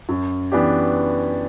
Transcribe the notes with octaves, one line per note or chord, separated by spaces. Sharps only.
F#2
E3 B3 D4 G4